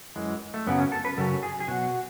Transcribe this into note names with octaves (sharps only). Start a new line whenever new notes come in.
F#2 E3 G#3
A3
F#2 C#3 F#3 B3
C#4
A4
B4
F#2 C#3 F#3 A4
G#4
G#4
B2 F#3 F#4